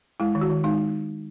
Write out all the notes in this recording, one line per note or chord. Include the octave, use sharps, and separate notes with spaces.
G#3 E4
D#3
F#4
D#3
G#3 D#4